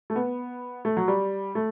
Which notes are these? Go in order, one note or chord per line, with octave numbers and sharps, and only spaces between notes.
A3
B3
A3
F#3
G3
A3